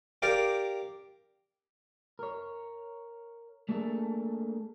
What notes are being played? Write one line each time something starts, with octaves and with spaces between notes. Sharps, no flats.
G4 A#4 D5 F5 G5
A#4 C#5
A3 A#3 D4 G#4 A4